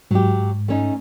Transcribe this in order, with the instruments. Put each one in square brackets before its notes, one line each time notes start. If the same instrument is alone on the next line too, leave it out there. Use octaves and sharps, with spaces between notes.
[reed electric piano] G#2 [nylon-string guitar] F#3 G4
[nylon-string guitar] A3 C#4 D#4